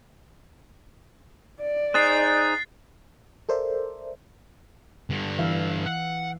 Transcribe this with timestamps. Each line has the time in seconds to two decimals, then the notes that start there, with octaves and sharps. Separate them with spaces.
1.61 D5
1.94 D#4 G#4 C5 F#6 A6 C7
3.49 A4 A#4 C5 D5 E5
5.10 G2 D3
5.38 E3 E5 F5
5.86 F#5